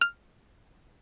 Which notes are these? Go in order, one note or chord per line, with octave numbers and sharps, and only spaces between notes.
F6